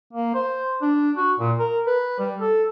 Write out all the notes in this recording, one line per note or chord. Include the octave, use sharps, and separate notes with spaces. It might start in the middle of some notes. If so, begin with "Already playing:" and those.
A#3
C5
D4
F#4
A#2
A#4
B4
G3
A4